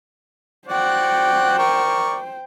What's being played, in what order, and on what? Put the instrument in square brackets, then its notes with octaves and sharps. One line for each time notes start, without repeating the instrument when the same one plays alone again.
[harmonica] F#4 D5 F#5 [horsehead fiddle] C5 G5
[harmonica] A#4 D5 C#6